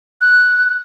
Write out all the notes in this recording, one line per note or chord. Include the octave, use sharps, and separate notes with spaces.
F#6